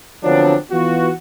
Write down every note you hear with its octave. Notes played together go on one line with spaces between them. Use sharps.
D3 F3 F#3 B3 C4 D4
E3 B3 F4 F#4